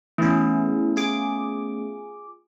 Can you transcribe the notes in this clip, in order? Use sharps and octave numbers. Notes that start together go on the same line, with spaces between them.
E3 A3 B3 C#4 G#4
F4 G#4 D6